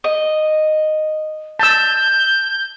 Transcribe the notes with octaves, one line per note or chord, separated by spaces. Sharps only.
D#5
A5 E6 G6